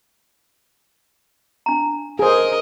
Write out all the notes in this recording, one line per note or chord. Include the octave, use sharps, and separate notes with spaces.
D4 A#5
G#4 A#4 C5 D#5